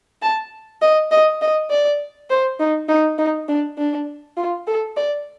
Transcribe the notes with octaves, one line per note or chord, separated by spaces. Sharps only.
A5
D#5
D#5
D#5
D5
C5
D#4
D#4
D#4
D4
D4
F4
A4
D5